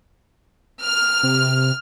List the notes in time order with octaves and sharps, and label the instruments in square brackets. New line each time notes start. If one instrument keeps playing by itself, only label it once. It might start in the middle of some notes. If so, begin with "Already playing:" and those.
[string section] F6
[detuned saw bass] C3